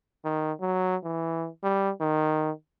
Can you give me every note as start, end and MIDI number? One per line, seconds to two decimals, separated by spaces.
0.25 0.52 51
0.61 0.96 54
1.04 1.48 52
1.63 1.91 55
2.00 2.51 51